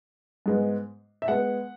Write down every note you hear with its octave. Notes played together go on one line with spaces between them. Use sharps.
G#2 G#3 B3
E5
G#3 B3 F#5